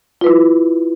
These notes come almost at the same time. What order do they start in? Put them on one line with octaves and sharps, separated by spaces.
F4 B4 E4